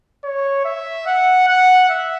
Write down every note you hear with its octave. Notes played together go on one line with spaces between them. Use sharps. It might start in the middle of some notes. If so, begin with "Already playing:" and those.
C#5
E5
F#5
F#5
E5